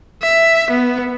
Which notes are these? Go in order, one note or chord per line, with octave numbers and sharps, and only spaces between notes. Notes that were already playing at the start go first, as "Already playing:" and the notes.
E5
B3